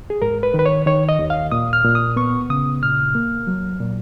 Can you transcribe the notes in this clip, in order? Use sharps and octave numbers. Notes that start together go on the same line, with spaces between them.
G#4
G#2 A#4
B4
D#3
B4
C#5
D#3 C#5
D#5
D#2
F5
A#2 D#6
F6
A#2
D#6
B3 C#6
C#3 D#6
A#2 F6
A#3
F#3
A#2